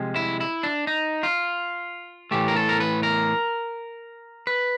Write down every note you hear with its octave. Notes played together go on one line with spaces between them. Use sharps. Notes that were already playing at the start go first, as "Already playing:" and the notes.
Already playing: C3 F3 G#3
E4
E4
D4
D#4
F4
A2 E3 A3 G4
A#4
A4
A#4
B4
A#4
B4